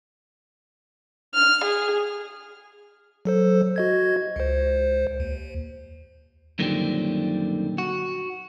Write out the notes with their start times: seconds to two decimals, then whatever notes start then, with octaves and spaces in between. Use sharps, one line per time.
1.34 F6
1.64 G#4
3.25 F#3 A4 C5
3.76 F#4 D#5 G#6
4.36 C#2 C5
5.20 D#2
6.59 F#2 A#2 D3 D#3 G3 C4
7.78 F#4